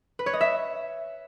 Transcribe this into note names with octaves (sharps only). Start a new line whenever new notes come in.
B4
C#5
D#5
E5